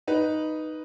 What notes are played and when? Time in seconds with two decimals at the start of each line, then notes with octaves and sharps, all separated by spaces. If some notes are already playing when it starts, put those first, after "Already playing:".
0.08 D#4 B4